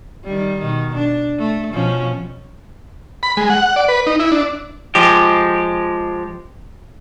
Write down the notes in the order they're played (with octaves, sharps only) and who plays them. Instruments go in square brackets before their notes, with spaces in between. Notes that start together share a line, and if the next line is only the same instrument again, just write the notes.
[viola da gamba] D#3 G3
B2 D#3
D4
A3
B2 F3 C#4
[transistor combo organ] B5
G#3
F#5
D5
B4
D#4
E4
D4
[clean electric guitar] F3 G#3 G4